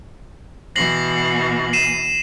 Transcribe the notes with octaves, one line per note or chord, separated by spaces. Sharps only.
B2 E3 A#6 C7 F#7
C7 D#7 E7